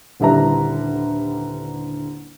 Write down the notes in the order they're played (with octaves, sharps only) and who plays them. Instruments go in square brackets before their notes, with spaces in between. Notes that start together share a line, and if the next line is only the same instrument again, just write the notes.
[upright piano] D#1 D3 G3 E4 B4 A#5